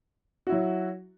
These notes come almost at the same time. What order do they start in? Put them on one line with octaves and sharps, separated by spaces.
F#4 E4 F#3